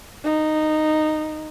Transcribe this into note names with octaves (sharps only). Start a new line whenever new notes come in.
D#4